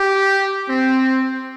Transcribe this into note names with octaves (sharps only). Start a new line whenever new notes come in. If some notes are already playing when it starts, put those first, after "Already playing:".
Already playing: G4
C4